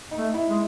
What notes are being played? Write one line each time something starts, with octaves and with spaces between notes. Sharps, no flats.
D#4
A3
E4
G#3